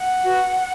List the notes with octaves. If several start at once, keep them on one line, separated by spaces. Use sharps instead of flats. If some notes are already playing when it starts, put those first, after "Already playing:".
Already playing: F#5
F#4 B4